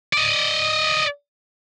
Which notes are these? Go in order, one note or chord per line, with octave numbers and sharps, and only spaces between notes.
D5 D#5